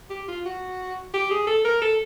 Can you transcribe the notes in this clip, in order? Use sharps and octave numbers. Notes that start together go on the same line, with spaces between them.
G4
F4
F#4
G4
G#4
A4
A#4
A4